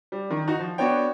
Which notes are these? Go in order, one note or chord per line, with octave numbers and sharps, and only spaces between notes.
G3
D#3
D#4 F#4
F3
B3 D4 F#4 C#5 G5